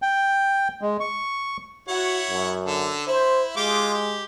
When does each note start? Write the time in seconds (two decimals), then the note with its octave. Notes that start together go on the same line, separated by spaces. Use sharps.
0.02 G5
0.82 G#3
1.00 C#6
1.88 E4 F#4 C#5 F#5
2.29 F#2
2.66 D3 A4
3.07 E4 C5
3.57 G#3 F4 G4 D6
3.93 G4